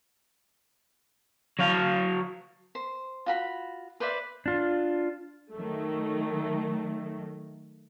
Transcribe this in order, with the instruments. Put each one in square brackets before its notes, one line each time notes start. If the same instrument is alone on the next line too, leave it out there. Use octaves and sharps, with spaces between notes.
[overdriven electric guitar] F#3 F5
[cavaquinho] C5
F4 F#4 B5
B4 C5 D5 E5
[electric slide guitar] D4 F4
[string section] D#3 F#3 A3